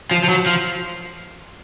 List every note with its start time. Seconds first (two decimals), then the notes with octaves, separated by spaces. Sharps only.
0.11 F3
0.24 F3
0.29 F#3
0.46 F3